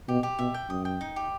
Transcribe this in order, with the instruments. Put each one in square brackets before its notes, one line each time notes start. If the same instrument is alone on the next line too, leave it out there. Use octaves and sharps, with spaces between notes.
[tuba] B2 [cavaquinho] G4
[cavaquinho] G4
[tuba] B2 [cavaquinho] E5
[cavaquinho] G5
[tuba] F#2 [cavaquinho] D#6
[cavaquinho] G5
D#4
G4